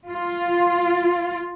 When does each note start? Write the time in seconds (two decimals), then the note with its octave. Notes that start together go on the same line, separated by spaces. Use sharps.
0.11 F4